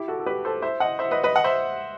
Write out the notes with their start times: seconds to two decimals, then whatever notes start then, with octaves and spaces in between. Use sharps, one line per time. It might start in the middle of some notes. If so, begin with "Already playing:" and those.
Already playing: E4 G4
0.08 F#4 A4
0.20 A4
0.26 G4 B4
0.45 A4 C5
0.62 C5 E5
0.80 D#5 F#5
0.99 C5 E5
1.11 B4 D#5
1.23 B4 D#5
1.36 D#5 F#5
1.44 C5 E5